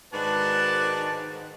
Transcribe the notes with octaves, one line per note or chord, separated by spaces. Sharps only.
G#2 D#3 D4 F#4 B4 D5 A5